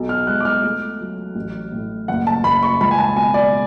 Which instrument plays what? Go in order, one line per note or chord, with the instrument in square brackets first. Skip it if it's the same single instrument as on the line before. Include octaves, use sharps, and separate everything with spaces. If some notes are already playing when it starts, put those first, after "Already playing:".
Already playing: [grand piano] B1
F6
G#3 F#6
D6
F6
A3
F#3
A1
A2
F#1 F#5
A5
F#1 B5
C#6
C#2 B5
G#5
A5
B2 G#5
D5